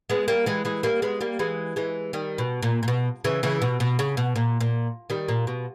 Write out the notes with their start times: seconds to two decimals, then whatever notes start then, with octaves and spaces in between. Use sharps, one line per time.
0.10 G#3 B3
0.28 G3 A#3
0.46 E3 G#3
0.65 E3 G#3
0.83 G3 A#3
1.02 G#3 B3
1.21 G3 A#3
1.39 E3 G#3
1.76 E3 G#3
2.13 D#3 G3
2.38 B2
2.63 A#2
2.83 A#2
2.88 B2
3.24 C#3 E3
3.43 C#3 E3
3.62 B2
3.80 B2
3.99 C#3
4.17 B2
4.36 A#2
4.61 A#2
5.10 D#3 G3
5.28 A#2
5.47 B2